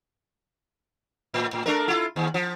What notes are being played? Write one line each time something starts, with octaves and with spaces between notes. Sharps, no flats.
A2
A2
A3 D4 A#4
E4 F4
D#2
F3